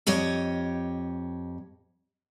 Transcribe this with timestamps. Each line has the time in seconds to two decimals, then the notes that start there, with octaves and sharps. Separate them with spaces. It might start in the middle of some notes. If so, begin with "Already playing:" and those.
0.07 F2 G4 C#5 D#5